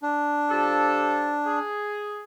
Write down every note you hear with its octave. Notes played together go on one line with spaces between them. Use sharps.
D4
F3 G4 A4
G#4